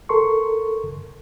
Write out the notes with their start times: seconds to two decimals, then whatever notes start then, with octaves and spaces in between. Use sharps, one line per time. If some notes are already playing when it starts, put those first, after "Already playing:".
0.09 A4 A#4 C6 C#6